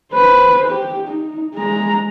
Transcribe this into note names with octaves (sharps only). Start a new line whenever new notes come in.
B4 C5
G4
D#4
G#3 A#5